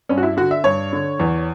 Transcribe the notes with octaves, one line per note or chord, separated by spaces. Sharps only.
G2 C#4
F#4
E4
D3 F#4
E5
G2 C#5
D3
E2